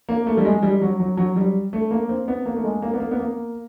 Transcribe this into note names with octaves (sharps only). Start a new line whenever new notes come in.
A#3
A3
G3
G#3
G3
F#3
F#3
F#3
G3
A3
A#3
C4
B3
A#3
A3
G#3
A#3
B3
A#3
B3
A#3